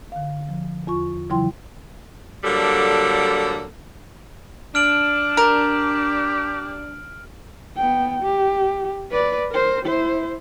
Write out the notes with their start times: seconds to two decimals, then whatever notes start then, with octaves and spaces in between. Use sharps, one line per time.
0.12 D3 F5
0.49 F3
0.87 E2 F4 C#6
1.30 C#3 E3 F#3 E4 G5 C6
2.44 D3 F#3 G3 A#3 A4
4.75 D4 F6 D7 F#7
5.37 G4 A#4
7.76 B3 G5
8.23 G4
9.11 B4 D5
9.52 A#4 C5
9.86 E4 C5